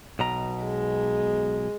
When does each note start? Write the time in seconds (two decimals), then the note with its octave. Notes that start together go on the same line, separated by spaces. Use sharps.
0.19 B1 B2 A#5
0.64 G#3